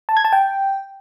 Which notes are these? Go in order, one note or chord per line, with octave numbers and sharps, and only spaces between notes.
A5
G#6
A5
G5